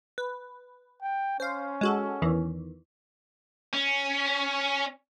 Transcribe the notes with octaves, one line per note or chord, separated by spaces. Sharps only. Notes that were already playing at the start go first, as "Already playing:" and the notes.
B4
G5
C#4 C5 F5
G#3 F#4 A4
E2 D#3 E3
C#4